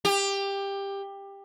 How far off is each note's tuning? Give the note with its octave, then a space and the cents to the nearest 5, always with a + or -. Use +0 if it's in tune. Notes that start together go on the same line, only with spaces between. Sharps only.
G4 +15